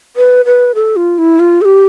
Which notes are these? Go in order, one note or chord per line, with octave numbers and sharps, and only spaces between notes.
B4
B4
A4
F4
E4
F4
A4
G4